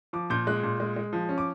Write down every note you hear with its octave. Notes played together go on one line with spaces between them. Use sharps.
F3 D6
A#2 G6
G#3 F#6
A#2
G#3
G#3
F3
C#4
D6